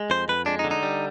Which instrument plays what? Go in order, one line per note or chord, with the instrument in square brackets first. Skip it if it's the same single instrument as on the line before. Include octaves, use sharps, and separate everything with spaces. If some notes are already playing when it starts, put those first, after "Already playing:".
Already playing: [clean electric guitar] G#3
F2 C5
F2 B4
G#3 D4
D#4
D3
D#4
G3